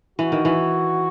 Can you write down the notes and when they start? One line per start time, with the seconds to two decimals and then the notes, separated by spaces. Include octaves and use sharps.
0.19 E3 F#4
0.32 D#3
0.45 E3